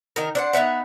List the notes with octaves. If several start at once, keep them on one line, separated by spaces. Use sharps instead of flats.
D#3 D#4 A#4
D4 C5 F#5
B3 D#4 E5 F#5